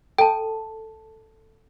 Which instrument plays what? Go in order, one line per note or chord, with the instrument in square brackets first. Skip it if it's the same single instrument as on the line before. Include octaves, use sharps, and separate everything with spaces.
[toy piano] A4 A5 [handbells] G5